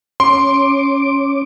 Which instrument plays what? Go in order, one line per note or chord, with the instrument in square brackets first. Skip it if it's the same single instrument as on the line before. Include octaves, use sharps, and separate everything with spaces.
[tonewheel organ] C#4 D6 [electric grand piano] C6